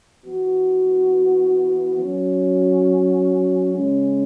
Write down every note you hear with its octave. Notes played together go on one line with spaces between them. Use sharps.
E3 B3 F#4
F#3 C#4 F#4
C#3 G#3 C#4